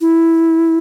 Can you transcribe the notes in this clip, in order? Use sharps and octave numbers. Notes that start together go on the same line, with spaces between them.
E4